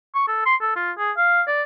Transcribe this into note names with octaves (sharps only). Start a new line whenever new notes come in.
C#6
A4
C6
A4
F4
G#4
F5
D5